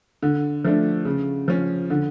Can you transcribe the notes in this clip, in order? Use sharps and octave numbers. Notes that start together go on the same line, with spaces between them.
D3
F3 A3 D4
C#3
F3 C#4
D3